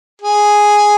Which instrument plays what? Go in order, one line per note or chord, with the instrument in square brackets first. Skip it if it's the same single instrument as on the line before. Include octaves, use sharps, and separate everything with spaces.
[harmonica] G#4